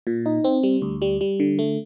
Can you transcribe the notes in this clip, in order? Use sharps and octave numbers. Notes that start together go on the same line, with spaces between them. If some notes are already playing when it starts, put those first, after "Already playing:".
A#2
D#4
C4
G3
D2
G3
G3
D3
A3